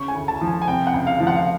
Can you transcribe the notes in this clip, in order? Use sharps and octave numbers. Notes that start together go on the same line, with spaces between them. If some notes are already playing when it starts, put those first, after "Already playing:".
Already playing: C#3 C#6
G#5
D2
A5
F3
G#5
G#5
C3 G5
F#5
C#2
F5
F3
F#5
F5